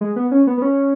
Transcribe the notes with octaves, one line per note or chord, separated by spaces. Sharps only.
G#3
B3
C#4
B3
B3
C#4